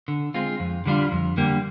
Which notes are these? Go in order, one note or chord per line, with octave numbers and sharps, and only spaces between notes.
D3
G#3 C4 F4
F2
D3 G3 D4 F4
F2
D3 G3 A#3